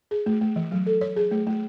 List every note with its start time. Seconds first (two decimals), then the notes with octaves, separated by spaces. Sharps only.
0.11 G#4
0.26 A3
0.41 A3
0.56 E3
0.72 F#3
0.86 A4
1.01 C#5
1.16 G#4
1.31 A3
1.47 A3